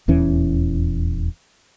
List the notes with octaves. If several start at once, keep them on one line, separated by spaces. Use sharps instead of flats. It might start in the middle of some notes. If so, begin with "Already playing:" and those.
D#1 E2 E3 C#4